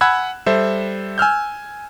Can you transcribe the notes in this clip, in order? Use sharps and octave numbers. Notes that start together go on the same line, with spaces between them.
F#5 G#5 B5 E6 F#6 G#6
G3 A4 C5 E5
G#5 E6 F6 G6